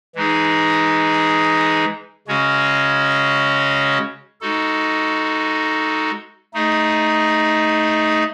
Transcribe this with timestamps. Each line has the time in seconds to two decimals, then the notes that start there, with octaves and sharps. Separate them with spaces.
0.15 E3 G#3 D#4 G#4
2.28 C#3 G#3 C#4 F#4 C#5
4.41 G#3 D#4 F#4 A4
6.54 A3 D#4 G#4 D#5